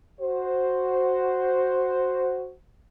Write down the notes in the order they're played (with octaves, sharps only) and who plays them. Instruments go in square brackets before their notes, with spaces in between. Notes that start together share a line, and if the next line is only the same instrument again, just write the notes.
[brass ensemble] F#4 C5